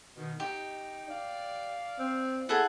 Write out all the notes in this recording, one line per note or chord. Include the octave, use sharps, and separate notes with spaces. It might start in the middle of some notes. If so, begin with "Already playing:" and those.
B2 D#3
D#4 G4
D5 F5
C4
E4 G#4 A4 F#5